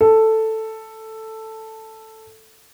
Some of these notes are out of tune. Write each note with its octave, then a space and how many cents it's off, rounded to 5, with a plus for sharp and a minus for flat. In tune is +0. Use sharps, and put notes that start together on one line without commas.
A4 +5